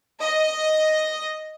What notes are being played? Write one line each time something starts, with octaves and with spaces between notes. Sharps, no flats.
D#5